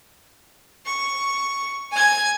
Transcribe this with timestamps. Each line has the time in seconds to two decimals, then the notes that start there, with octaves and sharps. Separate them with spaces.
0.85 C#6
1.92 G#5 G#6